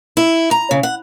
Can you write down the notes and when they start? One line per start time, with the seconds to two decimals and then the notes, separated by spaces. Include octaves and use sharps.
0.17 E4
0.51 A#5
0.71 C#3
0.83 F#5